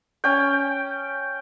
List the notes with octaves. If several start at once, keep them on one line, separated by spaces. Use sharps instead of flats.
C#4 G5